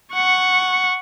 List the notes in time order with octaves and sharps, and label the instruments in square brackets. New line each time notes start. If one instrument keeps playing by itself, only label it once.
[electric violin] F#5 C#6